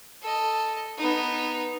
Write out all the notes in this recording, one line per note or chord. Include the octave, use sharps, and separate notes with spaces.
A4 D#5
B3 D#4